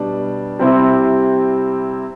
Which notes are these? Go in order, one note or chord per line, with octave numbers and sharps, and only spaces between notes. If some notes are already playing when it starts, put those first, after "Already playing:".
Already playing: B2 G3 D4
C3 G3 C4 E4